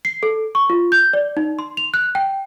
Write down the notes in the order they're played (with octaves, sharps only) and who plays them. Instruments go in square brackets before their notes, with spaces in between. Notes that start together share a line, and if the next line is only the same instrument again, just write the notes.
[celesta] C7
A4
C#6
F4
G6
D5
D#4
C6
F7
F#6
G5